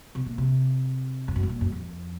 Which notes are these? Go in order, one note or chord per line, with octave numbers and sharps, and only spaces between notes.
C3
A#2
C3
F2
F#2
G#2
A#2
F#2
F2